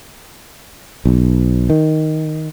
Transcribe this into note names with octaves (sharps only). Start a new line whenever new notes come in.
B1
D#3